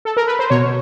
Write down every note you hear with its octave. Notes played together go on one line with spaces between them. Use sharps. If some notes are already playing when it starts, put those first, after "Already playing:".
A4
A#4
B4
C5
B2 C#5